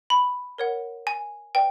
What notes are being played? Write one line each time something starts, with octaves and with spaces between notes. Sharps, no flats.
B5
A#4 C#5 F#5
G#5
B4 D5 G5